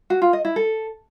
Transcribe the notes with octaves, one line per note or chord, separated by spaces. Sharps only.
F#4
F4
D#5
E4
A4